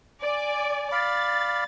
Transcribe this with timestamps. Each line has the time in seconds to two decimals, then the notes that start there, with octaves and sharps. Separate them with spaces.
0.21 D5 G#5
0.92 D5 F5 B5 A6